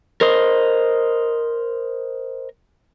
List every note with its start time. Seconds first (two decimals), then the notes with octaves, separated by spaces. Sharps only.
0.21 A#4 C5 D#5